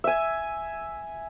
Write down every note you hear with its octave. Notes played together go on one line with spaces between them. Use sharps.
E5 G#5